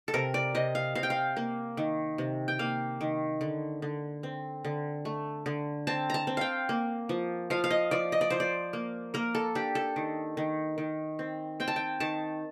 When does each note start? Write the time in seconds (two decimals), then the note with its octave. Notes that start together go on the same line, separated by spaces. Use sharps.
0.08 A4
0.14 C3 A#4
0.34 D5
0.55 C3 D#5
0.75 F5
0.95 C3 F5
1.03 G5
1.10 F5
1.36 A#3
1.77 D#3
2.18 C3
2.48 G5
2.59 A#3 F5
3.01 D#3
3.41 D3
3.82 D3
4.23 C4
4.65 D3
5.05 A3
5.46 D3
5.87 C4 A5
6.10 A5 A#5
6.27 C4
6.37 F5 G5
6.69 A#3
7.09 F3
7.50 F3 F5
7.64 F5
7.71 D#5
7.91 F3 D5
8.12 D#5
8.21 D5
8.30 F3 C5
8.40 D5
8.73 A#3
9.14 A#3 A#4
9.35 A4
9.55 D4 G4
9.75 A4
9.96 D#3
10.37 D#3
10.78 D#3
11.19 C4
11.60 C4 G5
11.68 A5
11.76 G5
12.00 D#3 A5